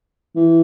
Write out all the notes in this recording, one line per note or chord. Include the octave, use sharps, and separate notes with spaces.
E3